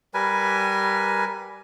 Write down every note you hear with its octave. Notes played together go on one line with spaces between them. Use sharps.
G3 A#4 B4 G#5